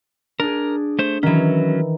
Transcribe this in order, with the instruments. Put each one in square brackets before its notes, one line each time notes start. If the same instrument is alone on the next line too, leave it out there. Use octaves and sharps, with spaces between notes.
[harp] D4 G#4 [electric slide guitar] A#4
[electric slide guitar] A3 C5
[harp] D#3 E3 [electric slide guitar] F#3 C#4